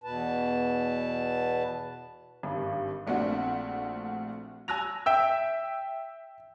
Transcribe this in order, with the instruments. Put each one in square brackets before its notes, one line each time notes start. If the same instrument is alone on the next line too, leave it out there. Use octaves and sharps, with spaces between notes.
[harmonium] E2 B2 B4 A5
[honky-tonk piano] G#1 G2
A#1 A3 C4 D4 F#4
G#5 A5 E6 F#6 A#6 F7
[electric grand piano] E5 G5 E6